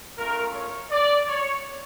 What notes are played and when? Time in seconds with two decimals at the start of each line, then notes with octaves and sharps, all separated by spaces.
0.16 A3 C#4 F4 A#4
0.53 C#5
0.90 D5
1.27 C#5